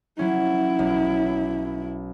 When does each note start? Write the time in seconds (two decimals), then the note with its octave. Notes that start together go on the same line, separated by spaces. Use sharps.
0.19 F#3 C#4 E4
0.79 B1